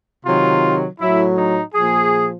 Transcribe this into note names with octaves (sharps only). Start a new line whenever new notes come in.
C3 D#3 F#3 F4
A2 F#3 E4
D#4
A#2 F3 G#4